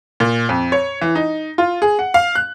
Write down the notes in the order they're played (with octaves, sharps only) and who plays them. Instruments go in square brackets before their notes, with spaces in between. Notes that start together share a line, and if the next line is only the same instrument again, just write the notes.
[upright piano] A#2
F2
C#5
E3
D#4
F4
G#4
F#5
F5
F#6